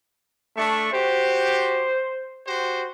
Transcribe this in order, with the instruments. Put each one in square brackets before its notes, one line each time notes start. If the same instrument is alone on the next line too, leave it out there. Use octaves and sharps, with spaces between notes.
[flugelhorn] A3 [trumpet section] D4 E5 C#6
[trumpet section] F#4 G4 [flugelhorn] C5
[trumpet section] F#4 G4 C5